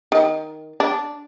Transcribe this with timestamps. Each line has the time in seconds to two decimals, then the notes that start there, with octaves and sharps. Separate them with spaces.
0.12 D#3
0.80 D4